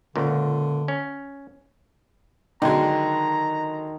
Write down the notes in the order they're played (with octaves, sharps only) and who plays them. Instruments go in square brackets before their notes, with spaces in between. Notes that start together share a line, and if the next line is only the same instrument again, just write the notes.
[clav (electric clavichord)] C#2 A#2 [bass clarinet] D3
[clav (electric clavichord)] C#4
[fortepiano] D3 F#3 G#3 [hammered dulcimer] D#3 [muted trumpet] A#5